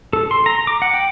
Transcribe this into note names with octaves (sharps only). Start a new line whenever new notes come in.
A4
C6
A#5
D6
F#5
G5